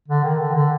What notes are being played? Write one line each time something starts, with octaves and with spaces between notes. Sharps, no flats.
D3
D#3
D3
D3